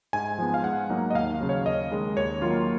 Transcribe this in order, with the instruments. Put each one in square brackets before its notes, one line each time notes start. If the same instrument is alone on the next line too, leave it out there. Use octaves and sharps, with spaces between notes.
[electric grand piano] G#2 G#5
F3 G#3 B3
F5
G#2 F#5
F#3 A#3 D#4
D#5
D#2 F5
C#3 F#3
C#5
D#2 D#5
D#3 G#3 C#4
D#2 C#5
D#3 F#3 A#3 F4